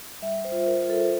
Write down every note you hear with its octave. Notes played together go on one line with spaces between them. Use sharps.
G3 E5
C5
F4
A#4
F4
A4